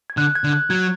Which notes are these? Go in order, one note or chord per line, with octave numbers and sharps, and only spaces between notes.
G#6
D3 F#6
G#6
D3
F#6
F#3 G#6